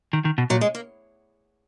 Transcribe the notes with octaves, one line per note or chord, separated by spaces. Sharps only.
D#3
D#3
B2
A#2 F#3
G#3
A#3